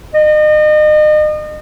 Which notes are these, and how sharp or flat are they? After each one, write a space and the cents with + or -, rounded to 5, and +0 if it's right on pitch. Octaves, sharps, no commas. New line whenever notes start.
D#5 -35